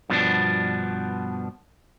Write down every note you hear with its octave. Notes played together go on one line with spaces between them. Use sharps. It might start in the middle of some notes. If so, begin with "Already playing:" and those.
G2 B2 F3 G3 B3 D4